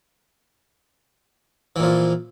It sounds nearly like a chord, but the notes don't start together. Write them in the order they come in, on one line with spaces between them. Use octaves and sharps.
E3 A#2 F3